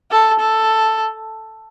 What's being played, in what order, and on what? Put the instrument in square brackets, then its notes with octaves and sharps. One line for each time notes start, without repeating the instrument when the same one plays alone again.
[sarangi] A4
A4